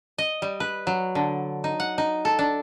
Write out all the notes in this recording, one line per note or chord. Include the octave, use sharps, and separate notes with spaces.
D#5
G3
B4
F#3
D3
D#4
F#5
D#4
A4
D4